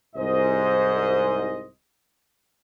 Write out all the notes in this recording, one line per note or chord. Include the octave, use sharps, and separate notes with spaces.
C2 G#2 C5 D#5